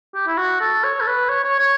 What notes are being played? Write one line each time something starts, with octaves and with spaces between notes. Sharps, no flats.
G4
E4
F#4
A4
C#5
A4
B4
C#5
C#5
C#5